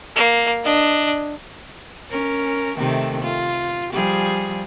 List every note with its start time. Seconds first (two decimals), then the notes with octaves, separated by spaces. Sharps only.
0.16 A#3
0.64 D4 D#5
2.10 C#4 A#4
2.77 C3 D#3 A3
3.22 F4
3.93 F3 G3 G#4